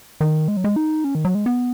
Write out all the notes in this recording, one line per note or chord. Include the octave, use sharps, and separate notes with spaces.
D#3
G#3
F#3
G#3
D#4
C#4
D#3
F#3
G#3
B3